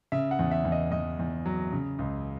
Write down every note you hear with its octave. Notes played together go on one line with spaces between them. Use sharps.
C#3 E5
F#5
E2
E5
E2
D#5
E2 D#5
E2
F#3
C#3
C#2